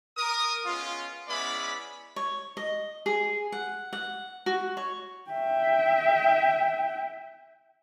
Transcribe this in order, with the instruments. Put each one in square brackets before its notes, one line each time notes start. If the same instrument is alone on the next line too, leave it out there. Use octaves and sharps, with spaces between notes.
[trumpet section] A#4 D#6
G#3 B3 C#4 F4
G#3 B3 C#4 E4 D5 B5
[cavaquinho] C#5
D#5
G#4
F#5
F#5
F#4
C#5
[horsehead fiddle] E5 G5